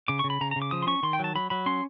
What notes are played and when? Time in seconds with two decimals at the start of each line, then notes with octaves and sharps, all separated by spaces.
0.08 C#3 D6
0.19 C#3 C#6
0.30 B5
0.41 C#3 A#5
0.51 C#3 A#5
0.62 D6
0.71 F3 D#6
0.82 C6
0.87 C#4 C#6
1.03 D#3 C6
1.13 G5
1.19 F#3 A5
1.35 F#3 B5
1.50 F#3 B5
1.66 C#4 C6